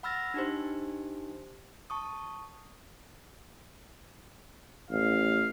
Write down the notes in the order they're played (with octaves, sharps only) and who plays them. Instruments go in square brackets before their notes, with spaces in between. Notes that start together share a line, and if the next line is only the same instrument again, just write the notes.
[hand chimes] F#5 B5 E6 F6 A6 A#6
D4 D#4 G4 C5
A5 C#6 D#6
[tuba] A1 [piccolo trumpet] F5